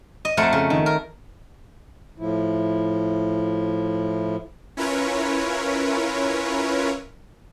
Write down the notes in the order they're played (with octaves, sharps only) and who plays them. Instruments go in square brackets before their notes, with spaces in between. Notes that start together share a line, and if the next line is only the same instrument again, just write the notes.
[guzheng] D#5
F2 A3 A#4 C5 F#5 A5
C#3
D#3
A#4
[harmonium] A2 F3 E4
[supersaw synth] C#4 E4 F4 A#4 B4 C#5